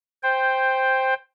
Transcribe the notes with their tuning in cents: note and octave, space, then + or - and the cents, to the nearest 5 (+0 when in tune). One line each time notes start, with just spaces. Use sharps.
C5 +0 G5 +10